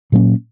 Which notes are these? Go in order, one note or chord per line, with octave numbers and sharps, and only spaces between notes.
A#2 F#3 A#3 C#4